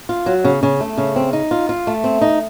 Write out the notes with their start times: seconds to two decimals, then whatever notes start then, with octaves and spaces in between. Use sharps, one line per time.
0.09 F4
0.26 F#3
0.44 C#3
0.63 C#3
0.81 A3
0.98 C#3
1.16 C4
1.33 D#4
1.51 F4
1.69 F4
1.87 A3
2.04 C4
2.21 D#4